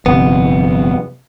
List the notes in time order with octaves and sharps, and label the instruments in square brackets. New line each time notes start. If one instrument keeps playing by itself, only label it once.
[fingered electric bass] G1 F2 C3 [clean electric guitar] B3